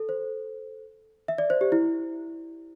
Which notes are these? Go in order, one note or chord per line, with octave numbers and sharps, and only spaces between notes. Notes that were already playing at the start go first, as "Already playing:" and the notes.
Already playing: A4
C5
E5
D5
C5
G4
E4